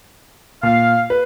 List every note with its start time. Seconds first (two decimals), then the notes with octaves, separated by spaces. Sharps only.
0.63 A#2 F5
1.10 B4